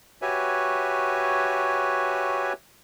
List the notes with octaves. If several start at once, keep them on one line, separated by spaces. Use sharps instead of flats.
F#4 G4 B4 C#5 E5 G#5